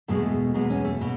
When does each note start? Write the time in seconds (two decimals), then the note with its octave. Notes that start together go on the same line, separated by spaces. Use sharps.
0.08 E2 B2 G#3 A3
0.54 E2 B2 G#3 B3
0.70 C#4
0.85 A3
1.01 B2